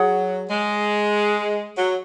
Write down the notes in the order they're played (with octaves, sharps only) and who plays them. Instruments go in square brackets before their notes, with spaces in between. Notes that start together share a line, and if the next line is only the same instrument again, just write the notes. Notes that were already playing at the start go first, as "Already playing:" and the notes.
Already playing: [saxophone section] F#3 [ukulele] G#4 C#5 F#5
[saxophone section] G#3
F#3